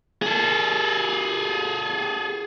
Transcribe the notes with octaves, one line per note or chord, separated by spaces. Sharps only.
G#4 A4